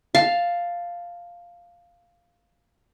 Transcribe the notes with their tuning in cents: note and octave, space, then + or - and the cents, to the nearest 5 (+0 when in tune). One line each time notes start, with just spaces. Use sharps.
F5 +0 A5 +0